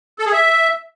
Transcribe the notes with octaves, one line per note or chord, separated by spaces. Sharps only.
A4
G#4
E5